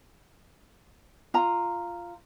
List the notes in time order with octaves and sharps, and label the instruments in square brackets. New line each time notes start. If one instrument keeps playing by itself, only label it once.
[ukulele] F4 A#5